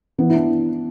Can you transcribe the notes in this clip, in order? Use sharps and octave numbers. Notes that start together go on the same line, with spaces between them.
E3 B3
E4
D4